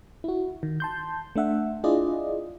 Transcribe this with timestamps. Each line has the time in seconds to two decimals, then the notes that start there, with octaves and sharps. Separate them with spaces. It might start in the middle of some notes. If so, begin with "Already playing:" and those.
0.24 E4 F#4
0.63 D#3
0.80 A5 C6 G6
1.36 A3 D4 E5 F#5
1.84 D4 E4 F4 G#4 D5 D#5